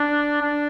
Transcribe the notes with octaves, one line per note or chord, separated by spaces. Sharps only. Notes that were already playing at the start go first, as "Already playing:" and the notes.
Already playing: D4
D4